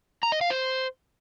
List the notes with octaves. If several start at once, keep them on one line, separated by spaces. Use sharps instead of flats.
A#5
D#5
F5
C5